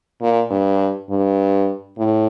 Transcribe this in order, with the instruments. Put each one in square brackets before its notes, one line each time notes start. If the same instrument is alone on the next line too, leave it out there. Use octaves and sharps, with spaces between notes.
[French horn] A#2
G2
G2
A2